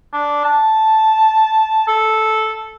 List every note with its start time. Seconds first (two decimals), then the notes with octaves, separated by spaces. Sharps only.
0.13 D4
0.44 A5
1.88 A4